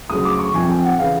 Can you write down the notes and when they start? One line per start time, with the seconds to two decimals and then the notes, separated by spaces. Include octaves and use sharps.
0.10 D2 C#3 F#3 D#6
0.25 D6
0.39 C#6
0.54 F2 C3 F3 G#5
0.69 G5
0.84 F#5
0.99 C#3 E3 F5